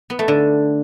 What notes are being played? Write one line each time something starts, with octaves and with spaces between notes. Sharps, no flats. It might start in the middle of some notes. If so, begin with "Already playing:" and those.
B3
A3
D3